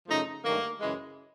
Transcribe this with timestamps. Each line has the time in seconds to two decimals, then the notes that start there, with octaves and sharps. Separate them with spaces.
0.08 F#2 C#3 F3 A3 D#4
0.45 G2 D#3 F#3 A3 A#3
0.80 F#2 C#3 E3 G#3